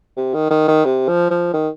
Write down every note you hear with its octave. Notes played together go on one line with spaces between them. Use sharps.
C3
D#3
D#3
D#3
C3
F3
F3
D#3